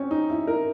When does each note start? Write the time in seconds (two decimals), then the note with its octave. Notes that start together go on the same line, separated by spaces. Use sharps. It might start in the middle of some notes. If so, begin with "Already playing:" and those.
Already playing: C4 C#4
0.11 D#4
0.30 E4
0.47 A#4